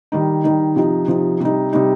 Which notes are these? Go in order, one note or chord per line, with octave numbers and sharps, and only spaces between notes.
D#3 G3 D#4
D#3 G3 D#4
C3 F3 D#4
C3 F3 D#4
C3 G3 D#4
C3 G3 D#4